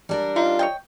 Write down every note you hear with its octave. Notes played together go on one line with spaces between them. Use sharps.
G3 D4 A#4
D#4 F4
C#5 D#5 G5